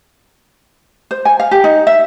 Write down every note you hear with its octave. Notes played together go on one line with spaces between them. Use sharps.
C5
G#5
F5
G4
D#4
E5